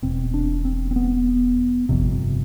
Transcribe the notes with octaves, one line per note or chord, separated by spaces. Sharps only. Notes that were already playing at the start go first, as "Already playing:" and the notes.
E1 E2 B2 C4
D4
C4
C4
B3
G1 F2 C3